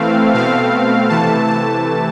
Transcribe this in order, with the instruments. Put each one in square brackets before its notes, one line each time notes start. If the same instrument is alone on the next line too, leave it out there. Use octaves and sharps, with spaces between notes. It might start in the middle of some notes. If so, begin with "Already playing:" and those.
Already playing: [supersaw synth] E3 A3 C4 F5
B2 A3 C4 F5
C3 E3 A3 A5
A5